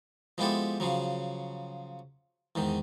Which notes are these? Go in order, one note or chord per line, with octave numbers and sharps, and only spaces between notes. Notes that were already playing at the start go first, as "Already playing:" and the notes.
F3 G#3 B3 E4 G4 A4
C#3 F3 F#3
E2 G#2 D#3